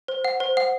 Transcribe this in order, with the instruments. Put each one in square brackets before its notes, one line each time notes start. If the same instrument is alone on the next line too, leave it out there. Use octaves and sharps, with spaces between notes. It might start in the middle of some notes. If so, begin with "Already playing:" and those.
[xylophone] C5
F#5
C5
F#5